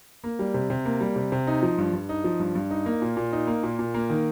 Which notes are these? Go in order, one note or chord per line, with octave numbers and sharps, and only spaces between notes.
A#3
G3
C3
C3
A#3
G3
C3
C3
D#4
F3
G2
G2
D#4
F3
G2
G2
D#4
A#3
A#2
A#2
D#4
A#3
A#2
A#2
A#3
D#3